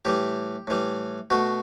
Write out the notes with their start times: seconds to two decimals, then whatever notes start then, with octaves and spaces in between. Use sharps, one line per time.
0.05 A2 E3 G3 G4
0.67 A2 E3 G3
1.30 B2 A3 F#4